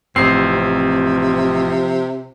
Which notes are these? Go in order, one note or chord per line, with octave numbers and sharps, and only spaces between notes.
A1 C3 F3 C4 C7